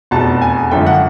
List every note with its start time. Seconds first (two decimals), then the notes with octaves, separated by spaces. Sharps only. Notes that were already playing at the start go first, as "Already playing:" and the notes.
0.11 F1 E2 B2 A5
0.42 G#5
0.71 G#1 F#2 D3 F3 G5
0.86 F#5